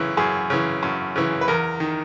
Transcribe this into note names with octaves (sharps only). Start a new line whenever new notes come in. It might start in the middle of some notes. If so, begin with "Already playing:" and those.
Already playing: F#2 C#3 E3
F#2 G#4
C#3 E3
F#2
C#3 E3
B4
E2 A#4
D#3